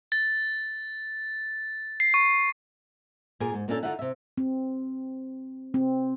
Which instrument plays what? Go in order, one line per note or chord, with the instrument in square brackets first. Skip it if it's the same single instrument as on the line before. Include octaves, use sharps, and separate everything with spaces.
[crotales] A6
C7
C#6
[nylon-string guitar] A#2 G#4 A#4 G#5
G#2
A#2 A#3 C#4 D4 A4
D3 D#4 F4 E5 F#5
C3 E5
[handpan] C4
C4